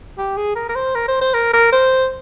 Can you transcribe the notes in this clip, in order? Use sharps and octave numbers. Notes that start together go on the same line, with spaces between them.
G4
G#4
A#4
A#4
C5
A#4
C5
C5
A#4
A#4
C5